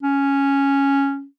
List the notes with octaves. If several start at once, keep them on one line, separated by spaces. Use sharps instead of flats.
C#4